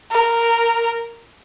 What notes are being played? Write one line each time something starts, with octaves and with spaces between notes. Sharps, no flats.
A#4